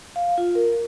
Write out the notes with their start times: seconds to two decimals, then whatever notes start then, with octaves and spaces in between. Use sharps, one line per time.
0.16 F5
0.38 F4
0.55 A#4